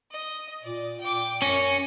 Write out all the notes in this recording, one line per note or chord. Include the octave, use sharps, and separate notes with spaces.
D#5
A#2 D5
G5 D6
F#2 C#4 A#6 C#7